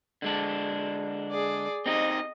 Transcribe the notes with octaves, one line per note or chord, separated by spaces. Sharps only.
D3 G#3 D4
G#4 D5
C4 D#4 G4 D#5